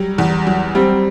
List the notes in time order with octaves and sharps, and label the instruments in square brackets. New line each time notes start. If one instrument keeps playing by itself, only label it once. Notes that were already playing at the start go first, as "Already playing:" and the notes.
Already playing: [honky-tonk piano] F#3 [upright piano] G3
[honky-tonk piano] E2
F#3
[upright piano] G3 [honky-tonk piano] C4